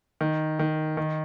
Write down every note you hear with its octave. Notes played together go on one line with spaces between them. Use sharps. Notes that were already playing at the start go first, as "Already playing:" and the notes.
D#3
D#3
D#3